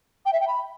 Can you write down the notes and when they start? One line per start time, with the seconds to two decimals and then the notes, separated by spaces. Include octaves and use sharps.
0.25 G5
0.32 E5
0.39 G5
0.47 B5